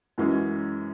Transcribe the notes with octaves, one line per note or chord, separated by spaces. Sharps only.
F#2 E3 G#3 C#4